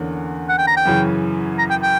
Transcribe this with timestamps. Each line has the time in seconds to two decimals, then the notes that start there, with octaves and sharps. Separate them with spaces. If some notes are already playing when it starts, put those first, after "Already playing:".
Already playing: E2 D3 A#3 C#4
0.49 F#5
0.58 G5
0.67 A#5
0.77 G5
0.85 F#2 C#3 E3
1.59 A#5
1.70 G5
1.83 G5